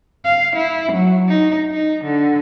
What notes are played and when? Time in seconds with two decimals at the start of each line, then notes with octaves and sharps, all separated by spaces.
0.25 F5
0.56 E4
0.92 F#3
1.28 D#4
1.72 D#4
2.04 D3